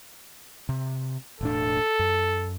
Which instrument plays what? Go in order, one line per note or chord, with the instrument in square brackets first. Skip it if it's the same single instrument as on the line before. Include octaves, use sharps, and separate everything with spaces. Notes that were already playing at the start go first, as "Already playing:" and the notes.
[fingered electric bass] C3
[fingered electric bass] E1 A2 D4 [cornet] A4
[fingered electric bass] F#2